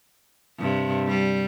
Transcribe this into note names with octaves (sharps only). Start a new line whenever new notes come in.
G2 C3
G3